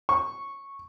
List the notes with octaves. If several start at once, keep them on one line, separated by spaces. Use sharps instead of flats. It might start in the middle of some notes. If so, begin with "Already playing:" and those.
C#6